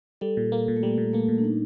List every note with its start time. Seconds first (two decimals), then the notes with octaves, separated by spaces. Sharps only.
0.21 G3 A4
0.37 A#2
0.52 A#3
0.68 A#2
0.77 A3
0.83 G3 A#3
0.98 A#2
1.13 A3 A#3
1.28 A#2
1.38 D4
1.44 D#4